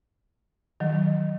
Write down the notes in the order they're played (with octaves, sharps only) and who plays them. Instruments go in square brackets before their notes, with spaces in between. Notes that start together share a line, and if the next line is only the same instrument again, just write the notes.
[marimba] D#3 F#3